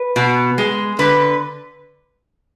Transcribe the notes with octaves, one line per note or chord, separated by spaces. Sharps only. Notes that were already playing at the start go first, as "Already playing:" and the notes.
Already playing: B4
B2
G#3
D3 B4